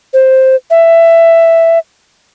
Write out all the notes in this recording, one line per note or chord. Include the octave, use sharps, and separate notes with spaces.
C5
E5